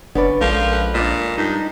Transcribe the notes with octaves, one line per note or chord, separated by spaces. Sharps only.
F#1 B3 C#4 D4 B4 D5
A#1 F3 G#3 A#3 A4
B4
A#2 D4 D5 D#5
G2 D#4